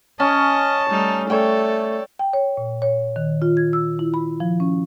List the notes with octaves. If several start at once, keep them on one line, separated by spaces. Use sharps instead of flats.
C#4 D#5 A5
G3 A3 D#4
A3 A4 C#5 D5 G5
G5
C#5
A#2
C#5
D#3
F4
G#6
E6
E4
B5
F3
C#4